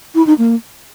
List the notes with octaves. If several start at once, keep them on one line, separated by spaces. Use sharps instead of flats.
E4
D#4
A#3